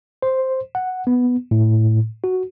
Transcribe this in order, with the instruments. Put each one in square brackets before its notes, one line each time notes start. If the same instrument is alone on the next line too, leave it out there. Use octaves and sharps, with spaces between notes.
[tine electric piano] C5
F#5
B3
A2
F#4